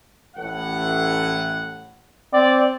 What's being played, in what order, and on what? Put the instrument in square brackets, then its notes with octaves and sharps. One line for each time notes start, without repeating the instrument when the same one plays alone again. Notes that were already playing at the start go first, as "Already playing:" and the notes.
[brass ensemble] A1 A2 F#5
[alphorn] C4 [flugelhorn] D5